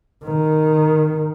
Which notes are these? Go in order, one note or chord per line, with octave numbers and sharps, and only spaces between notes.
D#3